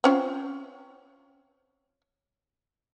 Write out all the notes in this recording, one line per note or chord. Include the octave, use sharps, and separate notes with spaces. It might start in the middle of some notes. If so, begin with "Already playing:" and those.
C4 C#4 F4